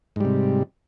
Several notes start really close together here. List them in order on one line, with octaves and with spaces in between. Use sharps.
G#2 G3 C3